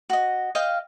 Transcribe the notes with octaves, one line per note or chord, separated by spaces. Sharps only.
F#4 D#5
D#5 F5 G5